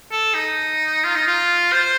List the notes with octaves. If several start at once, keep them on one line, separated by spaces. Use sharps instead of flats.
A4
D#4
F4
D#4
F4
C5